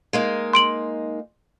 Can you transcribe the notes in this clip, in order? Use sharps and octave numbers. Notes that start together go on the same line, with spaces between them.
G#3 A#3 D#4
C6 D7 F#7